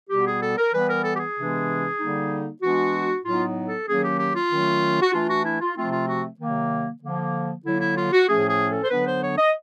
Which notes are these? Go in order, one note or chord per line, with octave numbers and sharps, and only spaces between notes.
B2 G3 B3 G4
G#4
A4
A#4
E3 G3 B3 B4
A#4
A4
G4
G#4
C3 E3 G#3 B3 D4
D3 G3 A#3 D#4
E3 G#3 B3 D4 F#4
A2 F#3 B3 D#4 F4
A4
D#3 F#3 A#3 C#4 G#4
G4
G4
F4
D#3 F#3 A3 C#4
F#4
E3 A3 D4 F4
F#4
E4
F4
C3 F3 A3 C4 F4
F4
F#4
C3 D#3 F#3 A#3
D3 F3 A#3
D3 F#3 A#3 E4
E4
F4
F#4
A2 F3 A3 C#4 G#4
G#4
A4
C5
D3 F#3 B3 D4 B4
C5
C#5
D#5